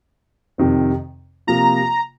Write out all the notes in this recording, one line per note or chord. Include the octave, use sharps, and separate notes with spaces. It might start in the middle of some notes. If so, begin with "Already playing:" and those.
F2 C3 D#3 C4
C3 F3 A#3 F4 A#5